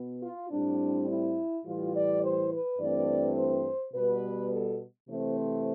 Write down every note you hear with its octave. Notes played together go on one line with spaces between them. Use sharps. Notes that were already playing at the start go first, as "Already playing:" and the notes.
Already playing: B2 B3
F4
A2 G3 C4 D4
E4
A2 E3 G3 F4
D5
C5
B4
G2 E3 A3 C4 D5
C5
B2 G3 B3 B4
A4
C3 E3 A3 C4
C5